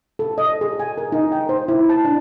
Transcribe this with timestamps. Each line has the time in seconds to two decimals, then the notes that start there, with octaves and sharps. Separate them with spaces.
0.19 A4
0.38 D#5
0.61 G#4
0.80 G#5
0.98 A#4
1.12 D#4
1.32 G5
1.49 C5
1.68 E4
1.89 A5
2.05 D4